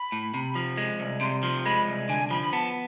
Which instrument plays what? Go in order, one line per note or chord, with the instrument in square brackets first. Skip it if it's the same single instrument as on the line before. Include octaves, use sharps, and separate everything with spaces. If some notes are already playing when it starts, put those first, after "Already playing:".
Already playing: [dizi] B5
[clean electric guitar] A2
C3
F3
G#3
C2
[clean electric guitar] C3 [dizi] C6
[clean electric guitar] F3 [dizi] C6
[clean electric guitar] G#3 [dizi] B5
[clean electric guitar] C2
[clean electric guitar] D3 [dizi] G#5
[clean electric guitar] F3 [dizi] B5
[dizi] B5
[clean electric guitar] B3 [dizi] A5